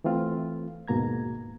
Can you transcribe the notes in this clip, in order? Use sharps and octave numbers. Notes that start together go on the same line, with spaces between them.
E3 A3 C4 F4
D#2 G#2 B2 A#3 A#5 G#6